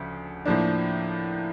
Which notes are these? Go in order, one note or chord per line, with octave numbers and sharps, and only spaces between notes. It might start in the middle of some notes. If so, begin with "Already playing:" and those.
Already playing: D2 C#3 F3
A2 F3 A#3 D4